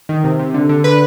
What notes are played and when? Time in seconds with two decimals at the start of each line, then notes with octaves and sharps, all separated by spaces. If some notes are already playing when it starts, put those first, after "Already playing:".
0.09 D#3
0.24 C3
0.39 C3
0.54 D3
0.69 D3
0.84 D3 B4